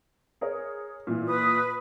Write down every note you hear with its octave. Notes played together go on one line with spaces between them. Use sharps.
G#4 A#4 C#5
A#2 E3
B4 D#6